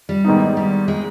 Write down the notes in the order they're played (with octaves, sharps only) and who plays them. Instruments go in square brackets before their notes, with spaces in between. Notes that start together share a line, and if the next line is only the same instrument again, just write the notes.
[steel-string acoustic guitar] G3
[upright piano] G#2 D#3 B3 D#4
[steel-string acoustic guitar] G3
G#3